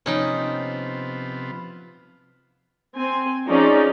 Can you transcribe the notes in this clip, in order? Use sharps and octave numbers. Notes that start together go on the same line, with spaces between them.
C3 F3 B3 C#4 D#4 G5
C4 G#5
F3 C#4 D#4 G#4 D5